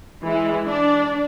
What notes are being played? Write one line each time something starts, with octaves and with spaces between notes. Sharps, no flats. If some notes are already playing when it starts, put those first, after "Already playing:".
E3 G#3 E4
D4 D5